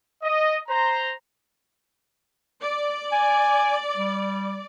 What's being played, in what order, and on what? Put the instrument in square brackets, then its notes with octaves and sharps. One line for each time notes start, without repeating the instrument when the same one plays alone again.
[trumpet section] D#5
C5 A#5
[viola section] D5
[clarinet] G#5
G3